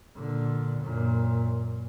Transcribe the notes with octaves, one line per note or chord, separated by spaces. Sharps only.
A#2 D3
F#2 A#2